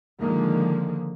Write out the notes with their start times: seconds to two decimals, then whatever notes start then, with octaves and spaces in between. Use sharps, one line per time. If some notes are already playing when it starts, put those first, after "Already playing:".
0.21 D3 D#3 F3 G#3 A#3